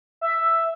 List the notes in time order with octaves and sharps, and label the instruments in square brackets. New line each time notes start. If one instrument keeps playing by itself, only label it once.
[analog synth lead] E5